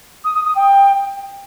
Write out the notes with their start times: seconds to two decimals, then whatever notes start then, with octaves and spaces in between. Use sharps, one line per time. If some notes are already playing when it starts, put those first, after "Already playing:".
0.25 D#6
0.35 D#6
0.45 D#6
0.55 G5